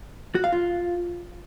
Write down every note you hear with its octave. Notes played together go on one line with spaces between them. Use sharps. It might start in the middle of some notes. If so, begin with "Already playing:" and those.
F#4
F5
F4